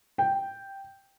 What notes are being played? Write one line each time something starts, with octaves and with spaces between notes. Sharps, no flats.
G5